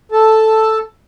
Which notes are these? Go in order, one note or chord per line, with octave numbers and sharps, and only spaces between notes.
A4 A5